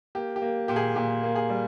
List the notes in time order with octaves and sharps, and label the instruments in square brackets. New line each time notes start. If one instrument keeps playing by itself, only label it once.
[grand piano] A#3 G4
G4
A#3
A#2 G4
G#4
A#2 G4
A#3
G#4
G3